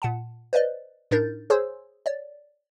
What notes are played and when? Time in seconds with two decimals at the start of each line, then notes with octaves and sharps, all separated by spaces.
0.02 A#2 F#5 A5
0.53 B4 C5 D5 D#5
1.11 A2 D4 D#4 A#4 G6 A6
1.50 G#4 C5 C#5 G#5 C6 E6
2.06 C#5 D5